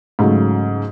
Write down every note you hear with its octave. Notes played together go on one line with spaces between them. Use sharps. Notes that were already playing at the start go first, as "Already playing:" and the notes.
G#2 C#3 F#3 A3